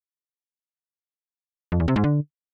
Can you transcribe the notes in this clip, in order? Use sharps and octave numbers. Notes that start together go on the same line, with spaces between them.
F2
E2
C3
G#2
D3